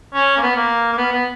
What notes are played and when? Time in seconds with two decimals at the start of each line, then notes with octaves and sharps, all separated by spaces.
0.14 C#4
0.37 A#3
0.43 B3
0.56 A#3
0.93 A#3
0.98 B3
1.13 B3